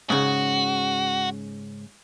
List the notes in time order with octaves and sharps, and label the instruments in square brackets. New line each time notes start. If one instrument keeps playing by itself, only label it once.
[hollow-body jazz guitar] G#2 C#3 [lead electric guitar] F#4